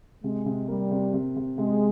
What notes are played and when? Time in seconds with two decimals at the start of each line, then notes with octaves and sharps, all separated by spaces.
0.23 C3 G#3
0.46 C3
0.68 G3 A#3
0.91 C3
1.14 C3
1.36 C3
1.58 C3 G#3